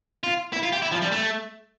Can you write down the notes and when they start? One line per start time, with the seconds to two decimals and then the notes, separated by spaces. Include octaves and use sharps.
0.23 F4
0.53 E4
0.63 F4
0.72 G4
0.82 E4
0.92 F3
1.02 G3
1.12 A3